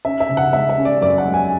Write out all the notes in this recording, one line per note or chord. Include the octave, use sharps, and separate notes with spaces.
C#4 E5
E5
C#3
F#5
G#3 E5
E5
C#4
D5
F#2 D5
F#5
G#3
G#5